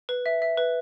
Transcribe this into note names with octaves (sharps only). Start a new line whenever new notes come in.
B4
E5
E5
B4